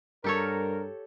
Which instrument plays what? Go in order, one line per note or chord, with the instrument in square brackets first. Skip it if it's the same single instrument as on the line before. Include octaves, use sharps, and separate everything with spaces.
[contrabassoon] G2 [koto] G4 A4 C#5 [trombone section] A#4